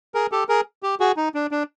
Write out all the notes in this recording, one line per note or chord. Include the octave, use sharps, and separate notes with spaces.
G#4 A#4
G4 A4
G#4 A#4
G4
F#4 G#4
D#4
D4
D4